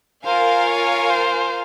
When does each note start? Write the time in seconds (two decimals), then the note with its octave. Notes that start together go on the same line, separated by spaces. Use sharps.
0.25 F4 A#4 C5 F5 G#5
0.67 C#5
1.10 C5